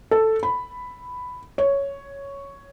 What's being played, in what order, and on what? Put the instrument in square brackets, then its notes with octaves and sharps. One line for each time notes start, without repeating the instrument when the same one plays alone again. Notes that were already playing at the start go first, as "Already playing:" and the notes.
[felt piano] A4
B5
C#5